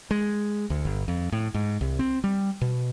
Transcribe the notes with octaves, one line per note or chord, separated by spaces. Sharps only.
G#3
D2
G1
F2
A2
G#2
C2
C4
G3
B2